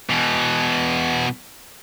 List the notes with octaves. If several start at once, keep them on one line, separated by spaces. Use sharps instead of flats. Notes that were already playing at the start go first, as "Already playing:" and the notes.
B2 E3